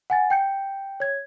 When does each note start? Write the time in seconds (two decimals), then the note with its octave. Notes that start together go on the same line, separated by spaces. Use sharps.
0.10 F#5 G#5 A6
0.30 G5 G6 C#7
1.00 C#5 G#6